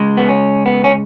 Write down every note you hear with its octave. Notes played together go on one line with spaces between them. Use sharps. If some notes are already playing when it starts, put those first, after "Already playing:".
Already playing: C#3 G#3
B3
C#4
B3
C#4